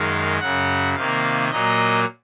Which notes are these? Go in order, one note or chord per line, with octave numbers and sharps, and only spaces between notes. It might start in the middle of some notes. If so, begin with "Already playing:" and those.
Already playing: F#2 D#3 G#3 F5
F#2 C#3 F#3 F#5
C3 D#3 A#3 F5
A#2 F#3 A#3 D#5